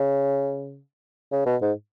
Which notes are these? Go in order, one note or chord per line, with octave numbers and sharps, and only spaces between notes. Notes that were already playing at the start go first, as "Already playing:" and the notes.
Already playing: C#3
C#3
B2
G#2